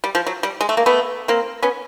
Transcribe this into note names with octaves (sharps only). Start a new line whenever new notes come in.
G3
F3
F#3
G3
G#3
A3
A#3
A3 B3
A#3 C4
B3 C#4